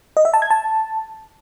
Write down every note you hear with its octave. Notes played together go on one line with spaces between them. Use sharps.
D#5
E5
A5
G#6
A5